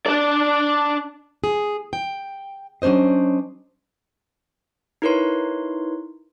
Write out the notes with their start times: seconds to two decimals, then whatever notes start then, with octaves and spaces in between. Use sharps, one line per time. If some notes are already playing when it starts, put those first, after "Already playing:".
0.06 D4 D5
1.44 G#4
1.93 G5
2.82 F#3 C#4 D4 C5 D#5
5.02 D#4 E4 A#4 B4 C#5 C6